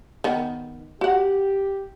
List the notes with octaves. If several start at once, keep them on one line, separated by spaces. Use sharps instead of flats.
D#3 B3
F#4 G4 F#5